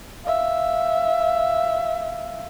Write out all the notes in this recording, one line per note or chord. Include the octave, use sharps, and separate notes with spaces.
E5 F5